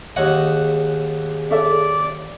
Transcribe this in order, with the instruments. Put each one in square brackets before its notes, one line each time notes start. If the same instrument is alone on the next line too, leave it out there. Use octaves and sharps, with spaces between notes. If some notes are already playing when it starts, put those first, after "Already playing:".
[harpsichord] D#2 F#5 [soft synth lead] G#4 [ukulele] C#5 D#5
[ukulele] C#4 A4 E5 [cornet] D5